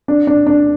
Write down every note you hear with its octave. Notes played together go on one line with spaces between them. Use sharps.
D4
D4
D4